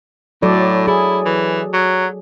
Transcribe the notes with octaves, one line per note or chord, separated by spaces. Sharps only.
A2 F#3 A4 D5
E4 G#4
E3
F#3